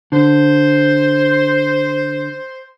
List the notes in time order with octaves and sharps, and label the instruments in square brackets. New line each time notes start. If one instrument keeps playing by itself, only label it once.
[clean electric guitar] D3 [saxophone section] C5